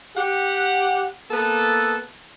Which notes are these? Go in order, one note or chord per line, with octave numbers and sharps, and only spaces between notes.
G4 F#5
A#3 B3 A4